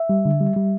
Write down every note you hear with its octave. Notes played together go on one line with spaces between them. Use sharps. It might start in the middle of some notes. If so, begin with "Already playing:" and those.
Already playing: E5
G3
D3
G3
G3